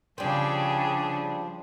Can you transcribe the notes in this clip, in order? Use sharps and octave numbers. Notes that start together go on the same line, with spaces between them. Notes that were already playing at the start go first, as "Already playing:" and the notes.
C#3 F3 G3 C4 D4 G#4